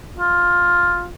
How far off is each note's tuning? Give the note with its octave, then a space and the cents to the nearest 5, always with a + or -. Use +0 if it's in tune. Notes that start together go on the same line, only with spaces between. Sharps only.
F4 +10